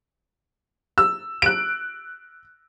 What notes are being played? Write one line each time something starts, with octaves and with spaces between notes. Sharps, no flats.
E6
F#6 D7